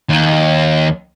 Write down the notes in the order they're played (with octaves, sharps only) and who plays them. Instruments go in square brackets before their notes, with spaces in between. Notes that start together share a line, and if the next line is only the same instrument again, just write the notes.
[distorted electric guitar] D#2